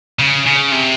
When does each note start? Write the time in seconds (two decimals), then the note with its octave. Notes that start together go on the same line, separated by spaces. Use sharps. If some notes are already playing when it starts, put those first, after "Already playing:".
0.19 C#3
0.46 C#3
0.72 C3